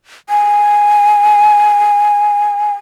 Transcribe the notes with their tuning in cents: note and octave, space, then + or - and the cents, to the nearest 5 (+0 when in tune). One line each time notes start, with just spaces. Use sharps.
G#5 -5